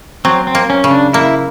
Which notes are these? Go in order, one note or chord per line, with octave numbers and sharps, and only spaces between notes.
F#3 C4
C4
A#3
C#4
C#3
D4
A#3 E4